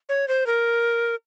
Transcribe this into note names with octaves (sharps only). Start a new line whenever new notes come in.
C#5
C5
A#4